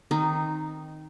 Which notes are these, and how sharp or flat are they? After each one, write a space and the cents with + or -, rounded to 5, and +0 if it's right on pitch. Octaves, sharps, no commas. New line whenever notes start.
D#3 +0 C4 +0 D#4 -10